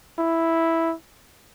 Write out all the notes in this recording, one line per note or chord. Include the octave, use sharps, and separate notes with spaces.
E4